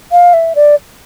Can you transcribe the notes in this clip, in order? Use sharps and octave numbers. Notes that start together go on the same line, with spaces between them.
F5
E5
D5